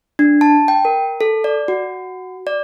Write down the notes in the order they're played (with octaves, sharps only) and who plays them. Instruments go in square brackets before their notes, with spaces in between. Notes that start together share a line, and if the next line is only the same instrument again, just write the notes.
[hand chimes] D4
A5
G5
A#4
A4
D5
F#4
D5